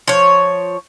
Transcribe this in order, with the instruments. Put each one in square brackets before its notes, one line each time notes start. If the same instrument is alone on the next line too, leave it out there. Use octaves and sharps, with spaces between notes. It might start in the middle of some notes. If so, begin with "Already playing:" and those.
[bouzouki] F3 C#5